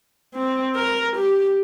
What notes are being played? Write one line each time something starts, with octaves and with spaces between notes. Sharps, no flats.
C4
A#4
G4